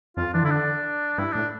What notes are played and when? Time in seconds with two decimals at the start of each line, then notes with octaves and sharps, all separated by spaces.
0.17 F2 F4
0.34 E3 D4
0.42 D3 E4
0.50 D4
1.18 G2 E4
1.32 A2 D4